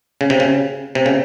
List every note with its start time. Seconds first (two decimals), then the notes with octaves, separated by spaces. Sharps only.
0.21 C#3
0.30 C3
0.40 C#3
0.95 C3
1.06 C#3